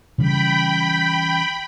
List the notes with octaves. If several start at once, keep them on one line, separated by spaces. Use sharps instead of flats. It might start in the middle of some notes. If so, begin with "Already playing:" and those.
C#3 E3 G3 G5 B5